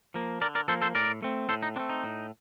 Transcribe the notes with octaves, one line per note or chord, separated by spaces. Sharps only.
F3 A#3
D3 A#4 D5
A#4 D5
F3 A#3 A4 C5
A4 C5
A2 A#4 D5
A3 C4
A2 A4 C5
D#4
A3 C4 D4
D#4
A2